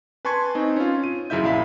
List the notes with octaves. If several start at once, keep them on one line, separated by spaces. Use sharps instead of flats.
B4 G#5 A5 C6 C#6 G#6
C4 D#4
C#4 F4
D#7
F#2 C#3 E4 E5 G6
A#1 E4 E5 F5 B5 B6